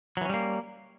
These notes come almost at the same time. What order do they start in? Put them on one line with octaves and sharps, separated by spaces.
F#3 E3 C#4 G3 A#3